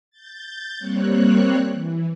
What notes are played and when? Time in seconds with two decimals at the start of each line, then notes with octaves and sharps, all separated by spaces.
0.11 G6 A6
0.78 G3 A#3 C4 C#5 F#6
1.72 E3